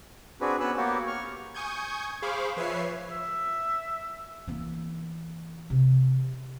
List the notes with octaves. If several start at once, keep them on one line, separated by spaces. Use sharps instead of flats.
C4 D4 F#4 G#4 B4
B3 C#4 B4 E6 F#6
A#3 B3 F#4 G4 C#5
C#6 F6
G#5 C#6 D#6 G6 G#6
G#4 C5 F5 B5 C#6 D6
F3 B4 C#5 E5 C7
E5
E3 A#3
C3